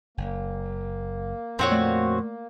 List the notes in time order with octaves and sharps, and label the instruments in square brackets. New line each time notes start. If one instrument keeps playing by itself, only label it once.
[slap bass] F#1 [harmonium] A#3
[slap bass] F2 A#2 [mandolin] C4 F#4 C#5
[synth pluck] A3 D5